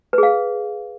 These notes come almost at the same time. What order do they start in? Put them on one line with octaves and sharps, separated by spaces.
B4 G#4 F5